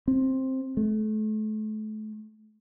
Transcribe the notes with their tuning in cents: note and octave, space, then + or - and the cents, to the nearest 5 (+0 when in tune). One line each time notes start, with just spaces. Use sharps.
C4 +10
A3 -35